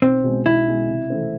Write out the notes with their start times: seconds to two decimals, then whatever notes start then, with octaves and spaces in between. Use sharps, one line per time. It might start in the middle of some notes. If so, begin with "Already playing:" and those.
0.02 B1 C4
0.24 B2 G#3
0.46 B1 E4
0.68 B2 G#3
0.89 C3
1.10 E3 A3 C4